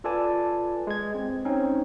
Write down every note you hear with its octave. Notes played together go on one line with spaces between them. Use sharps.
F4 A4 B4 D5 G#5 A5
G#3 G#6
C4
C4 C#4 D#4